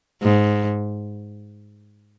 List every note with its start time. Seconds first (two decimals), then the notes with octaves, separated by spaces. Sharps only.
0.23 G#2